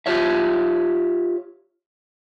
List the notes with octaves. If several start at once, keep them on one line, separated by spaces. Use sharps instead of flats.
F4 G4 C#5 E5